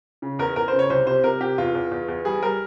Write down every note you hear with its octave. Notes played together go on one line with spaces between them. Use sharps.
C#3
E2 A#4
E2 A#4
C5
C#3
C#5
C2 C5
C3 C5
C3 A#4
C3 G4
E2 F4
E2
E2
E2
G3 G#4
G3 A#4